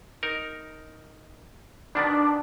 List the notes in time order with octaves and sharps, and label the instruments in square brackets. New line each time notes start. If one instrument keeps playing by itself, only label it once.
[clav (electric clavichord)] D#4 A#4
[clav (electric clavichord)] B2 D#3 B3 [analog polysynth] D4